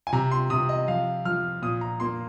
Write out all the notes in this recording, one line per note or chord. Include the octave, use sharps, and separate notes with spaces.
G#5
C3 A#5
C6
C3 D#6
D#5
F3 F5
F3 F6
A#2 D#6
A#5
A#3 C6